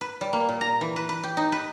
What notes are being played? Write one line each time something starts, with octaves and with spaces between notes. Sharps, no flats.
B4
G3
A#3
A#2
A#5
E3
B4
B4
G4
D#4
B4